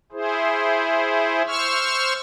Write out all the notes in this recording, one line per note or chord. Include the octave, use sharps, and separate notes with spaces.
E4 G#4 C5
C5 C#6 E6 F6